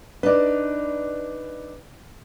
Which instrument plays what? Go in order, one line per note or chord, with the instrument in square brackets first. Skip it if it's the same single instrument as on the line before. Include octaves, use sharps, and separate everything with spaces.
[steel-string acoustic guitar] D4 D#4 [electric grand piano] B4 D5